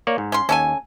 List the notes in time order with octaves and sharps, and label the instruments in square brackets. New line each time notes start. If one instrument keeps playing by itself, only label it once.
[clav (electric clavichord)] A#3 C#5 D5
G#2
[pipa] C#4 C6
[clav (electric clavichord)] D#2 [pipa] C#4 A4 G#5